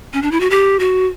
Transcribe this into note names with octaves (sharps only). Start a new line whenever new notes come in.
C#4
D4
E4
F#4
G4
F#4